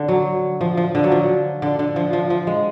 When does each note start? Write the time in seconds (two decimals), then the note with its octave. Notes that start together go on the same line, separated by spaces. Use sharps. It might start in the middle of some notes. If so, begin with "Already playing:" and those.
Already playing: D3
0.08 F#3
0.61 F3
0.77 F3
0.95 D3
1.04 F#3
1.12 F3
1.62 D3
1.79 D3
1.96 F3
2.13 F3
2.30 F3
2.47 G#3